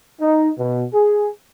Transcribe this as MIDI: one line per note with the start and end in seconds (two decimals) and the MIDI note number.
0.21 0.49 63
0.58 0.86 47
0.93 1.29 68